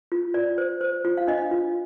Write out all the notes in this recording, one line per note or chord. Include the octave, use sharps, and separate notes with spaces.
F4
F4 D5
C5
C5
F4
F5
D4 D#5
F4